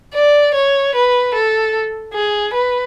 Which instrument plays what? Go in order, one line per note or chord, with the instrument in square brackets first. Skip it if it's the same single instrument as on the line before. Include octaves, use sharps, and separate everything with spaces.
[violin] D5
C#5
B4
A4
G#4
B4